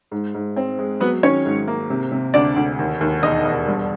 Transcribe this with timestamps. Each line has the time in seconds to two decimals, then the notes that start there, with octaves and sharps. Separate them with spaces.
0.11 G#2
0.34 G#2
0.56 C4
0.79 G#3
1.00 F#3 B3 B4
1.23 D#3 C#4 C#5
1.46 G#2
1.67 A#3
1.90 C3
2.12 C3
2.34 D2 D4 D5
2.56 D2
2.79 D#2
3.01 D#2
3.23 E1 D#4 D#5
3.45 E1
3.67 G2